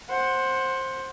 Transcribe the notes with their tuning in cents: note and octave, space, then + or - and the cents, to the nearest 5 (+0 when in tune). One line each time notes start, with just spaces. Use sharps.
C5 +15 F#5 +0